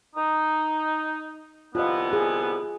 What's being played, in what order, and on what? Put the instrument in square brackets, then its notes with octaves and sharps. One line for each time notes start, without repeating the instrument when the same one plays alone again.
[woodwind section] D#4
[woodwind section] C2 D3 B3 [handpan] F4 D#5
[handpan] G#4